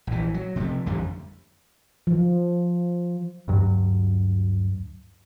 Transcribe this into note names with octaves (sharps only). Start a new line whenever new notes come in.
A#1 E3
F#3
C3 F3 F#3 A3
A1 F2 D3 G3
F3
D2 G2 F#3